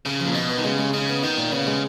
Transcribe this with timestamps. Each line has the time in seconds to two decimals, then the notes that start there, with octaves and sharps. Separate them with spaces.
0.05 C#3 A#4
0.20 F3
0.25 A#2
0.34 B2 D#4
0.49 B3
0.58 D#3
0.64 C#3 G#3
0.79 G#3
0.93 C#3 D#4
1.08 B3
1.23 D#3 D#4
1.38 A#2
1.52 C#3 B3
1.67 G#3